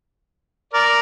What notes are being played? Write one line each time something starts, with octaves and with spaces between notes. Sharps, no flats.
A#4 D5